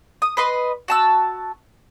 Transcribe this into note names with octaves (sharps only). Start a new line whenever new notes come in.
D#6
B4 D#5 C6
F#4 A5 E6